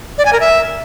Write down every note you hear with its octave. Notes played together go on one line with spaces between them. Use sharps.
D5
G#5
A#4
E5